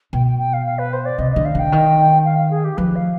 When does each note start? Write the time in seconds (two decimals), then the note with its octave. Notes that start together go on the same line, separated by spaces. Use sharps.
0.13 B2 G5
0.27 G5
0.39 G5
0.53 F5
0.66 F5
0.79 B4
0.93 C5
1.05 D5
1.18 C3 D#5
1.31 D3 D#5
1.45 F5
1.55 D3 G5
1.72 D#3
2.25 F5
2.38 F5
2.51 G#4
2.64 G4
2.78 F3 B4
2.96 F5